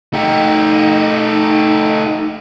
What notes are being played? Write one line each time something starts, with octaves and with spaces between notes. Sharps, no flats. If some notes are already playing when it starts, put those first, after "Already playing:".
A3 D#4 G4